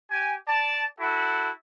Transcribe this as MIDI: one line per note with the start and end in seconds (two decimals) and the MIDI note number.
0.11 0.34 67
0.11 0.34 80
0.48 0.83 74
0.48 0.83 81
1.00 1.50 64
1.00 1.50 66
1.00 1.50 69